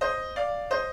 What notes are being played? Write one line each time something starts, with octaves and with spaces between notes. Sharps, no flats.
C5 D#5
D5 F5
C5 D#5